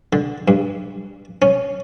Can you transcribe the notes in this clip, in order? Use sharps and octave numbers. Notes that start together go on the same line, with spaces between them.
D3
G2
C#4